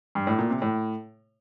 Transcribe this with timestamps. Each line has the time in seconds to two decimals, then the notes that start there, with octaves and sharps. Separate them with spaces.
0.15 G2
0.27 A2
0.39 A#2
0.50 C3
0.62 A2